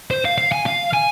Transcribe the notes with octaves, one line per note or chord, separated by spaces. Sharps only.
C5
F5
F5
G#5
F5
G#5